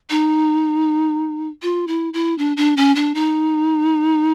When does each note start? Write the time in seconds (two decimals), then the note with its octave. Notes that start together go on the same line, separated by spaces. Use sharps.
0.10 D#4
1.62 F4
1.88 E4
2.13 E4
2.38 D4
2.57 D4
2.77 C#4
2.95 D4
3.15 D#4